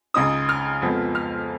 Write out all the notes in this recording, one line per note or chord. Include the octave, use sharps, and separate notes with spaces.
C#2 C#3 G#3 D#4 D#6
F6
F2 F3 G#3 B3
F6